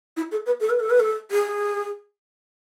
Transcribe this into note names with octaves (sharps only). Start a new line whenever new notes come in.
E4
A4
B4
A4
B4
A4
B4
A4
G#4